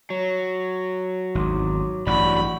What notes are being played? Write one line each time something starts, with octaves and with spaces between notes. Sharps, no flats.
F#3 C#5
G#1 E2 D#4 C6 D6
A1 G2 F#3 D5 F#5 B5 C#6